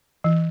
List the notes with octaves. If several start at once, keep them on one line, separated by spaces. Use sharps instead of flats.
E3